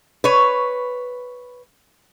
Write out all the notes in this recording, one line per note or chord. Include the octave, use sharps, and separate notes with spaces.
B4 C#5